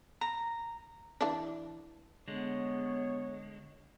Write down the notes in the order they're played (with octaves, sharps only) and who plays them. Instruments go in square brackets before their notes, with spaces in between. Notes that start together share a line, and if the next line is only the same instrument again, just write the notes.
[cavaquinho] A#5
[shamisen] E3 D4
[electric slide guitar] D3 G#3 [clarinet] B3 [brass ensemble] C#5